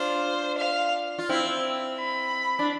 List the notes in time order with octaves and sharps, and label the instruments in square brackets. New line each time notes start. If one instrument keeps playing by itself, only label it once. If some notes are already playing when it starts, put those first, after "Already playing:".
Already playing: [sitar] D4 F4 [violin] C5
[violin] F5
[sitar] F4
C4 E4
[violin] B5
[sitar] D4